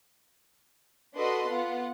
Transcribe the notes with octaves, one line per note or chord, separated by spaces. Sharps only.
D4 F#4 A4 B4 D#5 C6
B3 F4 F#5